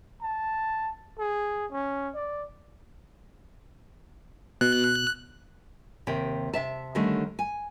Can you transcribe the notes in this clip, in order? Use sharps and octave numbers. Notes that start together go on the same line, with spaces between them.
A5
G#4
C#4
D5
B2 F#6
D#2 C3 G5
C3 E5 A5
D3 D#3 G3 A3 C#4
G#5